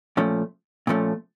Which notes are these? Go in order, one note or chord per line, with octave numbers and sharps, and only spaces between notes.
A#2 F3 A3 C#4
A#2 F3 A3 C#4